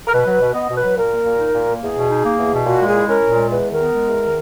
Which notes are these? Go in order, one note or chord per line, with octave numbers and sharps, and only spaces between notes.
A#4
B2 B4
F#3
B2
B3 D#5
B2
B4
F#3
A#2 A#4
A#3
A#2
D#4
A#2
A#3
E2 G#4
B2
D#4
A#3
E2
B2
A#2 F#4
G#3
G#4
E4
C#4 A#4
A#2
G#3
E2 B4
D#3
A#4
B3
G#3
E2
D#3